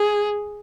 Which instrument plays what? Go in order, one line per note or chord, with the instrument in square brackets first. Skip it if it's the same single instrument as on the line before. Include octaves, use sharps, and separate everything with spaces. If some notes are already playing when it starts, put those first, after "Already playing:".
Already playing: [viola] G#4